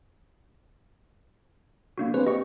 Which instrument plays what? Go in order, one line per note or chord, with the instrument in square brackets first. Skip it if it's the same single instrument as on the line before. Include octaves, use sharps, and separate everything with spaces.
[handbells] A#3 D4 F#4
[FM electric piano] C4 D4 G#4 [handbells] B4
[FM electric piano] G4 C#6 [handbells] D#5